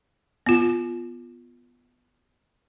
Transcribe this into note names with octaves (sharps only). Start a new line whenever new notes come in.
B3 F4